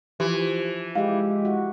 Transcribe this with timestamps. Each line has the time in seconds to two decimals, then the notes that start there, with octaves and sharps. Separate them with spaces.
0.20 E3 F3 G4
0.95 G#3 E4 G4 F5
1.45 F#4